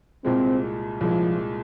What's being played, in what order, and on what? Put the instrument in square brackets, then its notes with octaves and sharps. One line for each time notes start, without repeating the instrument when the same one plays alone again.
[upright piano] C2 A#2 G#3 [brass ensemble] C4
[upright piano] C2 A#2 G#3 [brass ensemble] F3